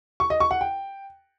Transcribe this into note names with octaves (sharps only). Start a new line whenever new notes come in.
C#6
D#5
C#6
F#5
G5